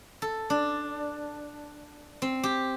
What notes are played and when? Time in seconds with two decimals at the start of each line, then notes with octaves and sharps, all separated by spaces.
0.22 A4
0.50 D4
2.22 C4
2.43 G4